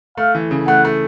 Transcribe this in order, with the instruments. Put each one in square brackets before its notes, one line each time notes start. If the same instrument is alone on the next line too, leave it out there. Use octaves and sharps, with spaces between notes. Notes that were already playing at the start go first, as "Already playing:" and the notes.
[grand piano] A3 [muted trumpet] F5
[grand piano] E3
C#3
[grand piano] A3 [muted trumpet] F#5
[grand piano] A3